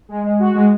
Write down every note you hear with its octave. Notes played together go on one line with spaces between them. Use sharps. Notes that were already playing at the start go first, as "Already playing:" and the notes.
G#3
G#3
F#4
G#3